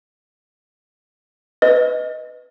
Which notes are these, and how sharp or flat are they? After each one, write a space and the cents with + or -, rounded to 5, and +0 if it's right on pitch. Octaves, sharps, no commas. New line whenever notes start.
B4 +10 D#5 +0